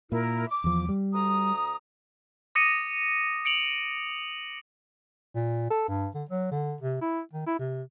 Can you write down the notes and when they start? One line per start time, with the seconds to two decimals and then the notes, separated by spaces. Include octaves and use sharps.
0.12 A#2 E4 A#4
0.50 D6
0.64 E2 F3
0.89 G3
1.14 D2 A#5 D#6
2.55 D6 D#6 A#6 C#7 D#7
3.45 C#7 D7 F7 F#7
5.35 A#2
5.70 A4
5.88 G2
6.15 D3
6.29 F#3
6.51 D3
6.81 C3
7.01 E4
7.33 D#3
7.47 E4
7.59 C3